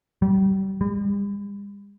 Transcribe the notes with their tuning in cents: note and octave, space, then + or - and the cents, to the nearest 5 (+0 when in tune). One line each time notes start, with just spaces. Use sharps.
G3 -30
G3 +45